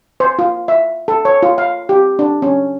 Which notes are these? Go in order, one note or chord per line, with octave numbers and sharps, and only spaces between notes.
C5
F4
E5
A4
C#5
F4
F5
G4
D4
C#4